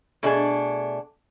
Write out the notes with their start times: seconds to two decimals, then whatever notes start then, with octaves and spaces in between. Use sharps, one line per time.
0.23 B2 A3 D4 G#4